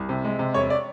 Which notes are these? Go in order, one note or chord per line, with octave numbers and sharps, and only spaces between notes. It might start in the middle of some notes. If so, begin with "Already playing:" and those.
Already playing: C2
C3
G#3
C3
E1 C#5
D5